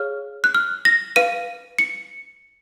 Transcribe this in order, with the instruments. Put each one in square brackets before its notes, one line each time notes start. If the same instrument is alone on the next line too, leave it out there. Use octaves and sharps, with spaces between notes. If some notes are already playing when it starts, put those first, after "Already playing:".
Already playing: [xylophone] G#4 C#5 F5 F6
F#6
F6
A#6
B4 F5 D#7
C#7